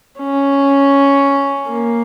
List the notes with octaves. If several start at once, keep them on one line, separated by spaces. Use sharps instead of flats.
C#4
A#3